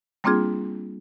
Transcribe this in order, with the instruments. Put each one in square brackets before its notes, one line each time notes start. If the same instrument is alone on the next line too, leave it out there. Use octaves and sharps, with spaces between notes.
[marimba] G3 A#3 C4 D4 F4 G#4